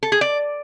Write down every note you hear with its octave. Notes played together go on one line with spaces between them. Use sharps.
A4
G#4
D5